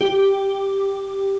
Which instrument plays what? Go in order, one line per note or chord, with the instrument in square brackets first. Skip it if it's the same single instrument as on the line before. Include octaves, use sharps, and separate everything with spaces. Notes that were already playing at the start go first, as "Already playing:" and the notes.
[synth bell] G4